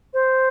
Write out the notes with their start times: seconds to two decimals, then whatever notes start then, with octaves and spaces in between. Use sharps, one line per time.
0.14 C5